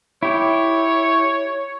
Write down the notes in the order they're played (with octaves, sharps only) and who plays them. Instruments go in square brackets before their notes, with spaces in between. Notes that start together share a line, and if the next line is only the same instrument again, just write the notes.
[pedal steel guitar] E4 G4 [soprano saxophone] C#5